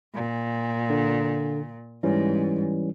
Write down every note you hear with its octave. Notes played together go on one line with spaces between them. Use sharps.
A#2
D3
G#2 E3 G3 C#4